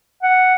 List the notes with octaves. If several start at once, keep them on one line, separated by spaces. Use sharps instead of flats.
F#5